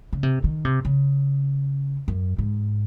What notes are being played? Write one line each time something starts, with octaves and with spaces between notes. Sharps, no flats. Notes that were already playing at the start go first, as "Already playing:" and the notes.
C#3
C3
D#3
C3
C#3
F#2
G#2